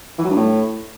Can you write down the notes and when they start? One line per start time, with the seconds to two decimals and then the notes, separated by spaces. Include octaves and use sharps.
0.19 E3
0.24 F#3
0.30 G2
0.36 A2